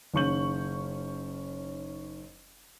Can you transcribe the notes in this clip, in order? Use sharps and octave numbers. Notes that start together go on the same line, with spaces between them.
F#1 D#3 C#4 C#6 G6 F#7